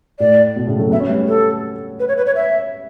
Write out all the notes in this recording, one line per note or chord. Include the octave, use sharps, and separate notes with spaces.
A2 D5
B2
A2 C#3
F#3 A3
B3 E5
C#4
G3 B3
A4
B4
C#5
B4
C#5
E5